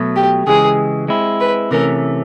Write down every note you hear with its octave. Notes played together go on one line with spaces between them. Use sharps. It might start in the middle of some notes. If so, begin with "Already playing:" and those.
Already playing: B2 F#3 A3
G4
C#3 E3 G#3 G#4
G#3 C4 E4
B4
C3 E3 A3 C#4 A#4